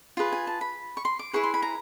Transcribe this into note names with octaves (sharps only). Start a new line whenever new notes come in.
F4 G#4 B4
G#5
A5
B5
C#6
C6
D6
E4 G#4 B4 C#6
C6
B5
A#5